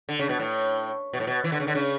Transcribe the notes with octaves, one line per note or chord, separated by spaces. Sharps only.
D3
C#3
B2
A2
B2
A2
B2
E3
D3
C#3
D3
C#3